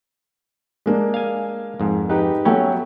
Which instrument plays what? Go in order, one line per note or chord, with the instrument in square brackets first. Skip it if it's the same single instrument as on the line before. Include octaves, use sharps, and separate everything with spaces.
[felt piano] G#3 A#3 D4
[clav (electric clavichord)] F5 G#5
F2 G#2
[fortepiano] D#4 G4 B4
[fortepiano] F#3 B3 A4 [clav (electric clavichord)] C#4 [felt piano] C#5 E5 G5